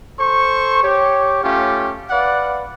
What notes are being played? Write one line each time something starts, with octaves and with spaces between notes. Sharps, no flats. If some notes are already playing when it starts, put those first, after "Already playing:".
A4 C5 C#6
G4 C#5
A3 C#4 F4 G4
B4 D5 F5 F#5